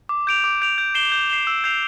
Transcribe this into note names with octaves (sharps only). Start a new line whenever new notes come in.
D6
G6 D7 F7
D6
G6 D7 F7
G6
C7 E7 G7
G6
C7 E7 G7
E6
G6 C7 F7